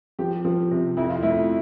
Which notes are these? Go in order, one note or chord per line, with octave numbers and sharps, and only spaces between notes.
F3 G4
F3
C3
F2 E4
F4
A3 E4